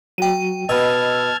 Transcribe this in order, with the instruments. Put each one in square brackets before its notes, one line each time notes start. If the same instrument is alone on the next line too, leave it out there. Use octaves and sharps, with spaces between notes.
[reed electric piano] F#3 F#4 [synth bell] G5 D#7
[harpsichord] B2 [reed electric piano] D#5 B5 [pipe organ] A5 F6 G#6 [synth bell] E6